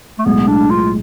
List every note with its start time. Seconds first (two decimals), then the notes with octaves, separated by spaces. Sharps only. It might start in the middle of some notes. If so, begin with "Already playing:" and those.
0.19 A3
0.26 B1 A2 G#3 B3
0.48 D4
0.71 F4